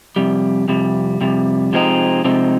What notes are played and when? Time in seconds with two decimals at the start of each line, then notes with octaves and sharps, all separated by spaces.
0.16 F2 C3 G3
0.68 F2 C3 G3
1.21 F2 C3 G3
1.73 C3 F3 G#3 C4 D#4
2.24 C3 F3 G#3 C4 D#4